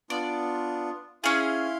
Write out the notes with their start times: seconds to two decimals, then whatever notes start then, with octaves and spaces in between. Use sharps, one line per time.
0.10 B3 D4 F4 D5
1.24 C#4 E4 G#4 F5 C6